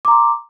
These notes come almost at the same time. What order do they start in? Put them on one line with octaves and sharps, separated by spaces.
D6 A#5 C6